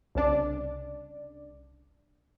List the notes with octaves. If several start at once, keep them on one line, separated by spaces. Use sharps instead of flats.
C2 C#3 D4 D5